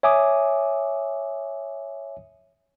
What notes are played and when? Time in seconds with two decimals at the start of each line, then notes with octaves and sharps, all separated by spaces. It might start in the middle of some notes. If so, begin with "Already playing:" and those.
0.03 C#5 E5 G#5 D6 D#6